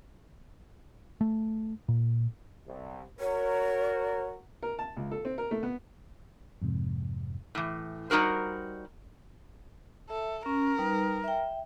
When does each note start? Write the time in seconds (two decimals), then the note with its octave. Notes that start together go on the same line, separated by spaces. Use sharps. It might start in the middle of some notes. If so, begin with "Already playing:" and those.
1.21 A3
1.88 A#2
2.67 C2
3.20 F#4 A#4 C#5
4.63 A#4
4.79 A5
4.97 C#2
5.11 A4
5.25 C4
5.38 A#4
5.51 A3
5.63 B3
6.62 F2 G#2 C3
7.55 A2 E3
8.10 G3 D#4 F#4 A#4 C5
10.10 A4 E5
10.46 C#4 A#4
10.78 G3 D#4 B4
11.24 E5 G5